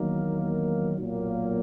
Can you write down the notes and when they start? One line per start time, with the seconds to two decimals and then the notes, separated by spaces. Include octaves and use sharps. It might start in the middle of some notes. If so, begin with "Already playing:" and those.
Already playing: E2 D#3 F#3 A#3 D#4
0.99 B1 A#2 F#3 A#3